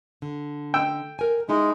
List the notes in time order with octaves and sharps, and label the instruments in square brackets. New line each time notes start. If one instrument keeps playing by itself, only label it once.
[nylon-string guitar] D3
[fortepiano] G5 E6
[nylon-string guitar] A#4 G#5
[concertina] G#3 [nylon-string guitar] D#4 E4